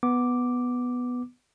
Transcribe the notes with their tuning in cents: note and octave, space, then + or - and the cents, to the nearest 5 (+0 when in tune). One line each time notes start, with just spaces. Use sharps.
B3 +0 D6 +0